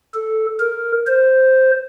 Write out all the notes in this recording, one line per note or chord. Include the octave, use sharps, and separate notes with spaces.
A4
A#4
C5